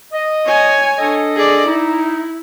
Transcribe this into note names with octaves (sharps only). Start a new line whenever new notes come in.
D#5
C#5 G#5
D4 A4 D#5
G#4 D5
D#4 E4